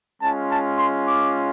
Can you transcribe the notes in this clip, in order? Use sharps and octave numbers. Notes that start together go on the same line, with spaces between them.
G#3 C#4 F4 A5
A5
C6
D6